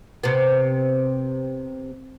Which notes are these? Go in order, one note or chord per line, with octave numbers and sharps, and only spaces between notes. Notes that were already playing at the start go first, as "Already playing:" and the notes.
C3 B3